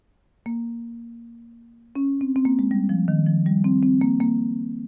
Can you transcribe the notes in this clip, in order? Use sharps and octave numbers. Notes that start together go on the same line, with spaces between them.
A#3
C#4
C4
C4
A#3
G#3
G3
F3
D#3
F3
G3
C4
C4
A#3
A#3